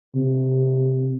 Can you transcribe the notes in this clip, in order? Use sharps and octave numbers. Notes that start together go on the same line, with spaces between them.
C3